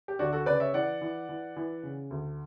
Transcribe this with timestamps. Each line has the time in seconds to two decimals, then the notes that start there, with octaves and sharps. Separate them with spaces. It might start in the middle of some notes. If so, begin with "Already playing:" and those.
0.08 G4
0.19 D2 D4 F#4
0.33 F#4 A4
0.46 C#3 B4 D5
0.60 C#5 E5
0.74 E3 D5 F#5
1.01 E3
1.29 E3
1.56 E3
1.83 C#3
2.10 D2